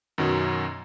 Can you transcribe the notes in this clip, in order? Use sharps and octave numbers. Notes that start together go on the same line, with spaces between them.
F#2 B2 D#3 F#3